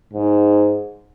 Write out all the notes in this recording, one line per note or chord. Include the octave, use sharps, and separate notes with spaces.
G#2